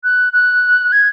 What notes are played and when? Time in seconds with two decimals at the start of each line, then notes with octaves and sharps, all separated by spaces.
0.04 F#6
0.33 F#6
0.92 G#6